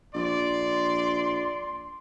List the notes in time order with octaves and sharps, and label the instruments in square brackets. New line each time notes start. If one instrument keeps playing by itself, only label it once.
[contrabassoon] A#1 [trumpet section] D5 [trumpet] C6